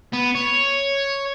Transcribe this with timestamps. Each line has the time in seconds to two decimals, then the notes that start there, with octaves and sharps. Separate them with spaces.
0.13 B3
0.35 C#5